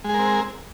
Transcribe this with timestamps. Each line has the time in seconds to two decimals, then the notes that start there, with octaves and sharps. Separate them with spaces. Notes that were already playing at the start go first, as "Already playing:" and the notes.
0.04 G#3
0.09 G#4
0.14 A#4
0.19 C4